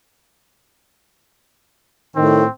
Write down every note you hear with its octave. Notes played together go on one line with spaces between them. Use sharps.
A2 D#3 C4